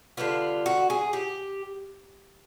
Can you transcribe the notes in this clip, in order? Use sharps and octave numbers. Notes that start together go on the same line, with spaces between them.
D3 G3 B3 F4
F#4
G#4
G4